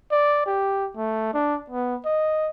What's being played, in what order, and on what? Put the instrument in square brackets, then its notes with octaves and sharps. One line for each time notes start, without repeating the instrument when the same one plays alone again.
[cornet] D5
G4
A3
D4
B3
D#5